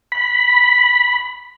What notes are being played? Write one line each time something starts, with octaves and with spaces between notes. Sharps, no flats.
B5